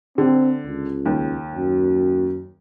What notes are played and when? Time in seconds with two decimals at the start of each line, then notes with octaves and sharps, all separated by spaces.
0.18 D3 C4
0.66 C#2
1.06 D#2
1.55 F#2